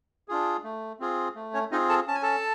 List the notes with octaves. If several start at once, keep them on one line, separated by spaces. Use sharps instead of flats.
D4 F4 G#4
A3
C4 F4 G#4
A3
C#4 C#5
C4 D#4 F4 G#4 D#5
A4 A5
C#4 A5
G#5
A4 A5